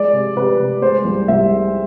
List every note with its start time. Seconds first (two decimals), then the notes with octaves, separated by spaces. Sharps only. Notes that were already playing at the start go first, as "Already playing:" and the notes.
Already playing: G#3 D5
0.13 C3
0.36 C3 B4
0.59 C3
0.82 G#3 C5
1.04 C2
1.28 C2 E5
1.50 G#3